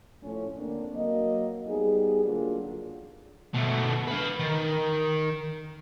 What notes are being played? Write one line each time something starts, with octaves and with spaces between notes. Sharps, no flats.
A2 F3 A3 C#4
D3 A#3 C4 D4
F#3 A#3 D#5
G3 B3 D#4 G#4
D3 F#3 A#3 D4 F4 G#4
B2 A3
B4 F5
D#3